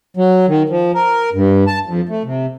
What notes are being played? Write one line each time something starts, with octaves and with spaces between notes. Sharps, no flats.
F#3
D#3
F3
A#4
G2
A5
F2
A3
C3